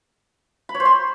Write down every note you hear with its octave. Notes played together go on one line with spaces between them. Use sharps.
B5
C#5
C5
C6